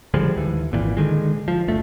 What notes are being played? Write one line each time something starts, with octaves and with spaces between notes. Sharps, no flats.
D3 F3 G3 G#3
D#2 E3
G#1 A#2 D3 E3
D3 D#3 G#3
F3
F#1 D2 A3